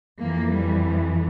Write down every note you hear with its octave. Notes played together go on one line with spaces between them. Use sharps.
F2 E3 A#3
G3